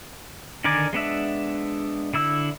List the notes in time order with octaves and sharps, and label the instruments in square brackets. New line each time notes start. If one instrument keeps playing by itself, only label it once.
[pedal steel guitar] D3 D#3 A#4 D5 G#5
G#3 B3 D4 E5
D3 E4 E6